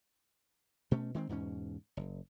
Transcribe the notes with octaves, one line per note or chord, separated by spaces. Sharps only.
B2 A3 C#4
D#3 G#3 B3 C4
E2 G#2 B2 C#4
F#1